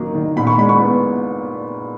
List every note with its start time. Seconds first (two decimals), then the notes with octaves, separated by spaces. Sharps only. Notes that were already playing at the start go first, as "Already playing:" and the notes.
Already playing: D#3 F#3 A#3
0.15 D#3
0.36 A#2 B5
0.47 C#6
0.58 G#3 B5
0.69 C#6
0.81 B3